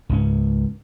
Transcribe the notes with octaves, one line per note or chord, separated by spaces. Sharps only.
C#2 G#2 C#4